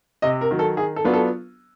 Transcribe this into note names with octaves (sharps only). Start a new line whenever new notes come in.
C3 D#5
A#4
D#3 F#3
A4
D#3 G#4
A4
F#3 B3 D4 F4
A4